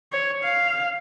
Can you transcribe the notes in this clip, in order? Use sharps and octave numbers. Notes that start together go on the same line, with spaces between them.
C#5
F5